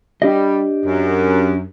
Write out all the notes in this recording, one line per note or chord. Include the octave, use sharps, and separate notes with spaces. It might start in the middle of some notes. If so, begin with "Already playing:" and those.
G3 D4 G4 D#5
F#2